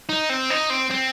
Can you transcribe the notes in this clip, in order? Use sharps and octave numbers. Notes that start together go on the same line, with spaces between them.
D#4
C4
D#4
C4
C4